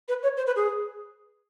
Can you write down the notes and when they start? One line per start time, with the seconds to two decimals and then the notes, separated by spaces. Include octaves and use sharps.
0.08 B4
0.23 C#5
0.37 C5
0.47 B4
0.56 G#4